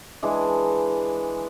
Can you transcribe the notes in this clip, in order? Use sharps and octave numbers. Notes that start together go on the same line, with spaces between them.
E3 G#3 D4